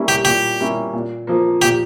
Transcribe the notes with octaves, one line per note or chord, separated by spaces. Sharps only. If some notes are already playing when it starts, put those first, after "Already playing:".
Already playing: G3 A#3 C#4 E4
G4
A#2 G4
G3 A#3 C#4 E4
A#2
F3 A#3
A#2 G4